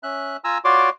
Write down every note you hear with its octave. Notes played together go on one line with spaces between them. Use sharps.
C#4 E5 F#6
F4 G#5 A#5 E6
F4 F#4 C#5 D5 C6 D6